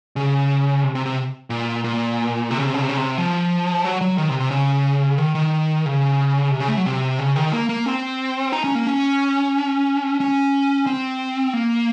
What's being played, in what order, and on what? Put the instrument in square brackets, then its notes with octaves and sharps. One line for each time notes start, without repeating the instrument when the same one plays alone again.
[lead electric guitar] C#3
C3
C3
C3
A#2
A#2
C3
C#3
C3
C#3
C3
C#3
C3
F3
F#3
F#3
D#3
C3
C3
C#3
D#3
D#3
C#3
C3
C#3
A3
F#3
C3
C#3
D#3
A#3
A#3
C4
D#4
C#4
A#3
C#4
C#4
C4
A#3